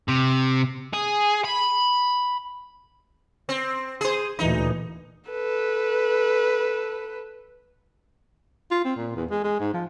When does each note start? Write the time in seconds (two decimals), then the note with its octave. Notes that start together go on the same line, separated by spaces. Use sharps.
0.09 C3
0.94 G#4
1.45 B5
3.49 C4
4.01 G#4 C5
4.39 D2 A#2 E3 D#4
5.30 A4 B4
8.71 F4
8.85 C4
8.97 A#2
9.16 E2
9.31 G#3
9.45 G#3
9.60 G#2
9.74 F3